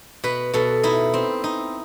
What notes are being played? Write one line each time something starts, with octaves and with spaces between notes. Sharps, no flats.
B2 B4
B2 A4
D#4 E4
C4
D#4